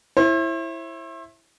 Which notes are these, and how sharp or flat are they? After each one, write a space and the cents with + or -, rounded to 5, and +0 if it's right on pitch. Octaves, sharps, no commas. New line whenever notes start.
E4 +5 C5 +45